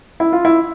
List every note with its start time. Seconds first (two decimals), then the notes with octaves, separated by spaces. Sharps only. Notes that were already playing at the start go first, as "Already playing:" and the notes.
0.20 E4
0.33 F4
0.45 E4